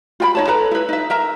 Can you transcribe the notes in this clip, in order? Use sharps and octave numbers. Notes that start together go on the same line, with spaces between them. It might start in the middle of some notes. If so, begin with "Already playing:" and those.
F4 G5 B5
D#4 C#5 A5
A4 B4 A#5
E4 B4
D#4 E5
A#4 E5 A#5